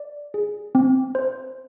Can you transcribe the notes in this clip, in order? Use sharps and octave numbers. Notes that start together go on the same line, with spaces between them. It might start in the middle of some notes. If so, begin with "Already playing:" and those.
Already playing: D5
G#4
C4
C5